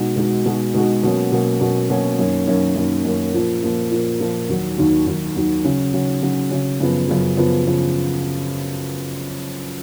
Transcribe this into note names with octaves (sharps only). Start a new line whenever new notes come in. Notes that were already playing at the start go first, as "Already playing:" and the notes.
Already playing: B2 G#3 D#4 F#4
B2 G#3 D#4 F#4
B2 G#3 D#4 F#4
B2 G#3 D#4 F#4
B2 F#3 A#3 C#4
B2 F#3 A#3 C#4
B2 F#3 A#3 C#4
B2 F#3 A#3 C#4
F#2 D#3 A#3 C#4
F#2 D#3 A#3 C#4
F#2 D#3 A#3 C#4
F#2 D#3 A#3 C#4
A#2 F3 A#3
A#2 F3 A#3
A#2 F3 A#3
A#2 F3 A#3
D#2 D#3 F#3
D#2 D#3 F#3
D#2 D#3 F#3
D#2 D#3 F#3
C#3 F#3 C#4
C#3 F#3 C#4
C#3 F#3 C#4
C#3 F#3 C#4
F#2 C#3 F3 B3
F#2 C#3 F3 B3
F#2 C#3 F3 B3
C#3 F3 B3